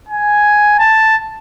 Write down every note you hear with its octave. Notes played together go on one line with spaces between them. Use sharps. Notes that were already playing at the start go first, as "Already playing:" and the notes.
G#5
A5